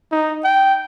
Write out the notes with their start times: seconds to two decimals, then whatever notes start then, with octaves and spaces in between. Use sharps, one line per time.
0.12 D#4
0.44 G5